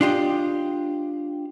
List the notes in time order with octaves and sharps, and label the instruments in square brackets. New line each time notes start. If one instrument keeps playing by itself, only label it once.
[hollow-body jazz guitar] D4 F4 G4 D#5